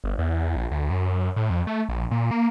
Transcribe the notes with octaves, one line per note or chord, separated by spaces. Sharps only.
G1
E2
A#1
D2
F#2
A2
F2
A3
A#1
A#2
A#3